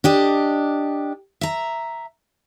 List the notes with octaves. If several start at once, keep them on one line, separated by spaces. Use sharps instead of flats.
D4 G4 D#5
E5 A#5